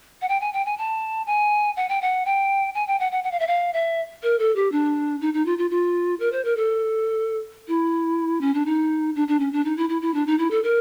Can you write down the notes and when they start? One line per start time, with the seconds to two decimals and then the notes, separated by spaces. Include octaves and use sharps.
0.22 F#5
0.29 G5
0.41 G#5
0.53 G5
0.66 G#5
0.78 A5
1.27 G#5
1.77 F#5
1.89 G5
2.02 F#5
2.26 G5
2.74 G#5
2.87 G5
3.00 F#5
3.12 F#5
3.24 F#5
3.32 F5
3.40 E5
3.47 F5
3.73 E5
4.23 A#4
4.39 A4
4.56 G4
4.72 D4
5.21 D#4
5.34 D#4
5.46 F4
5.58 F4
5.70 F4
6.20 A#4
6.32 C5
6.45 A#4
6.57 A4
7.68 E4
8.41 C#4
8.54 D4
8.66 D#4
9.15 D4
9.28 D4
9.40 C#4
9.53 D4
9.65 D#4
9.77 E4
9.89 E4
10.02 E4
10.14 D4
10.27 D#4
10.38 E4
10.51 A4
10.63 A#4